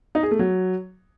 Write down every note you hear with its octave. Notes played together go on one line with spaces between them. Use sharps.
D#4
G#4
A3
F#3